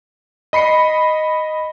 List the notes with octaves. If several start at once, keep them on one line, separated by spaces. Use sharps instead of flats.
D#5 B5 C7 C#7